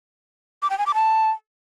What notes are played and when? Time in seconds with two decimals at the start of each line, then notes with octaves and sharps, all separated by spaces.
0.62 D6
0.70 G5
0.78 G#5
0.86 D6
0.94 A5